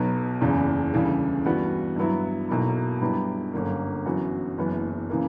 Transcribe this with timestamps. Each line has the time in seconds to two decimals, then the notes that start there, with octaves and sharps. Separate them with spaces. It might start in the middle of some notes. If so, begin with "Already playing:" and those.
Already playing: B1 B2 F#3 B3
0.41 F#1 E2 C#3
0.93 D2 C#3 E3 G3
1.44 G2 E3 G3 B3 F#4
1.96 G2 F#3 B3 E4
2.49 B1 B2 F#3 A#3 E4
3.01 G2 F#3 B3 E4 G4
3.53 G1 F#2 D3 A#3
4.06 F#2 E3 B3 F#4
4.57 F#1 F#2 E3 B3
5.09 C#3 E3 A#3